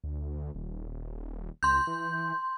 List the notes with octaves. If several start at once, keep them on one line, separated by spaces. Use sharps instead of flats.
D2
D#1
C#2 C6 G6
E3